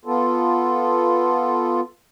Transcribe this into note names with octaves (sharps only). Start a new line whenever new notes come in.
B3 F4 A4